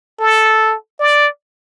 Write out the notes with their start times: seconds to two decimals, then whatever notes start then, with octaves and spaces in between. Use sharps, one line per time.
0.20 A4
1.00 D5